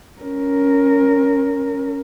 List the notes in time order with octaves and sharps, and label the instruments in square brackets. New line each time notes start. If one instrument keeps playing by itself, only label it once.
[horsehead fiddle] C#4 A#4